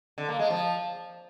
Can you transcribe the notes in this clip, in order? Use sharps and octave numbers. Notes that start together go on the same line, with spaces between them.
D3
A#3
G#3
F3